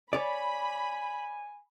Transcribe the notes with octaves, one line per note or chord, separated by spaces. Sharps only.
C#5 D5 G#5 B5